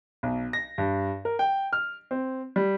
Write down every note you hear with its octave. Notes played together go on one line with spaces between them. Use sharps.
B1
A#6
G2
A#4
G5
F6
C4
G3